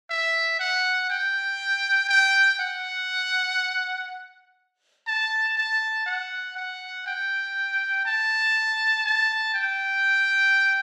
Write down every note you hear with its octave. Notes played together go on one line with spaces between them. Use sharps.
E5
F#5
G5
G5
F#5
A5
A5
F#5
F#5
G5
A5
A5
G5